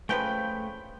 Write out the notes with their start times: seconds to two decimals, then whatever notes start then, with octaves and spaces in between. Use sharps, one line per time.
0.09 C#3 F3 A3 B4 G5